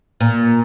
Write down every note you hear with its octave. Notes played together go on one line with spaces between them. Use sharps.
A#2